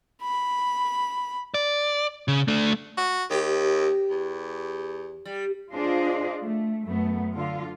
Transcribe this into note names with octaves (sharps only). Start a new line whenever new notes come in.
B5
D5
C#3
A3 D4
F#4
D#2 G4
E2
G3
D4 F4 G#4 C5 D#5
A3
F#2 A3 B3
D3 F4